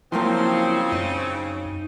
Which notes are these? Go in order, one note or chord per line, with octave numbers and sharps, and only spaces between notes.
C#3 F3 F#3 A#3 C4 E4 G5 C6
F#2 D#4